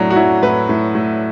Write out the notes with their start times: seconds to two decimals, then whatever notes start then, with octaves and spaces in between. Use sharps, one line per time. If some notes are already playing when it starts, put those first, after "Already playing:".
Already playing: A2 F#3 D4
0.10 F#4
0.16 F#3 E4
0.43 A2 B4
0.69 A2
0.95 A2